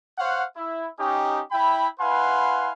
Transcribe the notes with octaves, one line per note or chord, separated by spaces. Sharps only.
C5 C#5 F5 F#5
E4
C#4 D#4 G4
E4 G5 B5
E4 B4 F5 F#5 G#5 C6